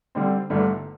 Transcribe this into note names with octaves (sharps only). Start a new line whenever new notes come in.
D3 G3 C4
G1 G2 D3 A3